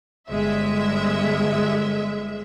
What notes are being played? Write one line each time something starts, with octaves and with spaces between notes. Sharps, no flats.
G1 G#3 E5